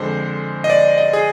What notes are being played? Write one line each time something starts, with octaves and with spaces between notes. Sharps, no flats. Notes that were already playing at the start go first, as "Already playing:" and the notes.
Already playing: F2 D3 G#3 C5
D#5
D5
D#5
G#4